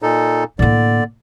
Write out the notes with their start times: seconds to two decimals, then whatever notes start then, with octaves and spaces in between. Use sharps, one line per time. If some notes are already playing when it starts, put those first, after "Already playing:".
0.02 A#2 D#4 A4
0.59 A2 D3 A#3 D5